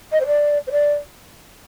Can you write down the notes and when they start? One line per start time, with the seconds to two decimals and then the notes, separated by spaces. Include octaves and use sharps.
0.12 D#5
0.21 C5
0.27 D5
0.67 C5
0.72 D5